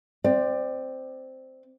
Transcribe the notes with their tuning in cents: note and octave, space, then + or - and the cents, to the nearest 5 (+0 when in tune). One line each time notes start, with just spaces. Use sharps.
C4 +0 D5 +20